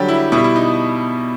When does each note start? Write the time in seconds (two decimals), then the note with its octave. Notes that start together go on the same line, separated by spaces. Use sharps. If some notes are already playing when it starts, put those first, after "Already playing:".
Already playing: D3 F#3 G3 G4
0.08 E4
0.32 B2 G3 E4
0.44 E4
0.56 D#4